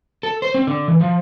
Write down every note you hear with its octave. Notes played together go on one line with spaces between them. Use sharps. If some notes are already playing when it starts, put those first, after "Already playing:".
A4
C5
C4
D3
E3
F3